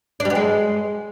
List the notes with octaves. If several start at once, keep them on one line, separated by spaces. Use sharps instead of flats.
D4
G3
B3
G#3